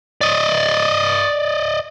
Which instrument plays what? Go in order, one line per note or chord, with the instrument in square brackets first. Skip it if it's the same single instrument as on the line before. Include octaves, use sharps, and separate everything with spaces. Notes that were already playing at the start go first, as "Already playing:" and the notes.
[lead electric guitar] D5 D#5